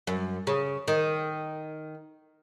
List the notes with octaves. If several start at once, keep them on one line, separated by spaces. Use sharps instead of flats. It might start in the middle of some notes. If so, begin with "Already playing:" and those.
F#2
C#3
D#3